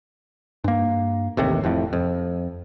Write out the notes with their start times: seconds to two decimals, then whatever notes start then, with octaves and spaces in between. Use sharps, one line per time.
0.64 G2 A#3
1.37 A1 D#2 C3
1.63 F1 F2 A2
1.93 F2